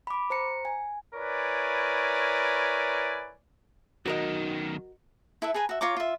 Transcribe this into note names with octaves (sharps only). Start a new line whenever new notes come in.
B5 D6
C5 A#5 C#7
G#5
E4 A#4 B4 C#5 D5 G#5
B1 D#3 F#4 A#4 D#5
E4 A4 B4 E5
G#4 B4 G#5 A#5
F#4 E5
F4 C#5 A#5 D6
F4 E5